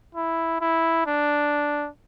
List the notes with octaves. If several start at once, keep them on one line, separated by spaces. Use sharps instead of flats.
E4
E4
D4